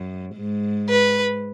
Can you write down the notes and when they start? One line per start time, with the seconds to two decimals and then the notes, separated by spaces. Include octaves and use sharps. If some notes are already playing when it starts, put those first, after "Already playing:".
Already playing: F#2
0.36 G#2
0.89 B4